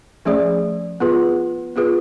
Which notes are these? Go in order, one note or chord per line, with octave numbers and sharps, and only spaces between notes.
F3 A3 C#4 G#4 D5
B3 F4 G#4 B4
B3 F4 G#4 B4